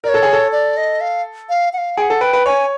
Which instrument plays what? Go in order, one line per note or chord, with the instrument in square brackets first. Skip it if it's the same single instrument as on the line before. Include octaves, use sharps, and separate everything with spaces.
[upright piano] A#4 [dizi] D5
[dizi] C#5
[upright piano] A4
G#4
A4
[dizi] D5
D#5
F5
F5
F#5
F5
[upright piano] G#4 [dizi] G5
[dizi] F#5
[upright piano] A4
[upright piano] B4 [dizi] G5
[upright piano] B4
[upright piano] C#5 [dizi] G#5